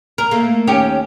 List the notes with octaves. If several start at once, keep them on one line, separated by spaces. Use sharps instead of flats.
A#4
A3 A#3
D#2 C#4 G4